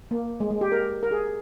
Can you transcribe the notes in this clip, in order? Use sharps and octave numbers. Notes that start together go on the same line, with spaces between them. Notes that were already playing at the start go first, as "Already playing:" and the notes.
A#3
G#3
G#3
G4
A#4
A#4
G#4